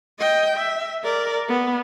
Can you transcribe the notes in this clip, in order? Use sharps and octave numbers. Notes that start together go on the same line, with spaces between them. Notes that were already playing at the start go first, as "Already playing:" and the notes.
D#5 G5
E5
A#4 D5
B3